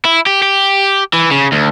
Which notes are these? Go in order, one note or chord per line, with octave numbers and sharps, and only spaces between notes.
E4
G4
G4
E3
C#3
D2